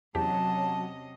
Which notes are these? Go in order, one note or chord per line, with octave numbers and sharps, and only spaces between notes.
E2 C3 F#3 C#4 G4 D#5 A5